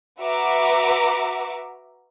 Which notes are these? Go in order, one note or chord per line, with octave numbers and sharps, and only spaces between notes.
F#4 B4 E5 A#5 D6